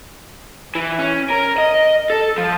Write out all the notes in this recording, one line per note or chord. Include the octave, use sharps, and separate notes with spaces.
E3
C#4
A#4
D#5
A4
F3